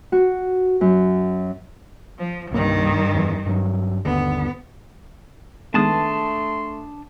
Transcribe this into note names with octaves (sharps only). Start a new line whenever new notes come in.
F#4
F#2
F3
C2 G2 D#3 A#3
F2 E3
G2 F#3
G1 D#2 D3 B3
D#3 G#3 A3 B3 D4 A5 C6 D#6